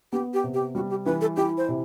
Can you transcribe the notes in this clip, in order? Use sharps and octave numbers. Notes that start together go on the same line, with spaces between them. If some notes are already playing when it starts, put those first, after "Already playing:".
B3 G4
G4
C3
G4
G3 F#4
G4
E3 B4
A4
E4 G4
C5
C3